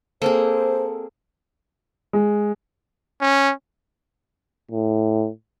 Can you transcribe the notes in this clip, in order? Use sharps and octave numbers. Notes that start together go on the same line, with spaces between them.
A#3 C4 G#4 A4 C5
G#3
C#4
A2